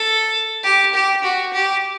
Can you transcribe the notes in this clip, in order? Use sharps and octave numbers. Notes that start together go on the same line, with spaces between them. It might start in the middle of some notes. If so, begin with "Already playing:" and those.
Already playing: A4
G4
G4
F#4
G4